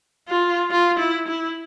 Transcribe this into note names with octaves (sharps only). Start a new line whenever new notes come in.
F4
F4
E4
E4